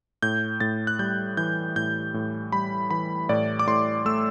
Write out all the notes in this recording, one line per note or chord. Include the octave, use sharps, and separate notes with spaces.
A2 G6
A2 A6
F#6
G3 G6
E3 G6
A2 G6
A2
G3 B5
E3 B5
A2 D5
D6
A2 C6
A3 E6